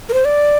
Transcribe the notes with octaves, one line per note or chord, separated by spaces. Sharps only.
A#4
C5
D5